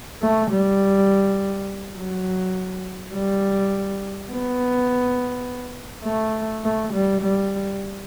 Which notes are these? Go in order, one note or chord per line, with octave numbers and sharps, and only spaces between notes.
A3
G3
F#3
G3
B3
A3
A3
G3
G3